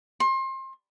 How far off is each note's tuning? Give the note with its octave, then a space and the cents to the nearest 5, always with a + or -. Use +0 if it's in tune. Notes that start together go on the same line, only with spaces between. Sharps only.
C6 +30